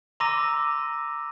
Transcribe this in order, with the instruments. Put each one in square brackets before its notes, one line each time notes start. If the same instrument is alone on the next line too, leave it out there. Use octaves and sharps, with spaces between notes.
[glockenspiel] A#5 C6 D6 E6 A#6 D#7